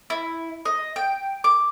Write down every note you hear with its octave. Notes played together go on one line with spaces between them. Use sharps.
E4
D#5
G5
D6